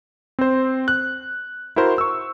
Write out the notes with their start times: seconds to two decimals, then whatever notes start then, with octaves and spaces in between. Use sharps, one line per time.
0.39 C4 C5
0.88 F#6
1.76 E4 F#4 A#4 C5 C6
1.98 C#6 E6